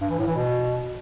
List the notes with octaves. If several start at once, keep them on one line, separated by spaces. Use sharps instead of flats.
G2
E3
A2
E3
B2